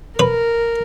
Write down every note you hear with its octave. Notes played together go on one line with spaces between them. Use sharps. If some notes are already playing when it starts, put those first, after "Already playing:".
A#4 B4